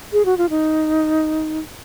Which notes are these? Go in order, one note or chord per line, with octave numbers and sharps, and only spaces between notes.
G#4
F#4
F4
D#4